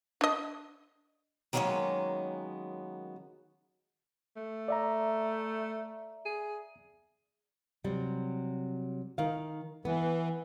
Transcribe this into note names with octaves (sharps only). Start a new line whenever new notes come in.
D4 D#5
D#3 F#3 G#3 A#3 B3 C#4
A3
D5 E5 A#5
G#4
C3 F#3 G3
D#3 F5
E3 B3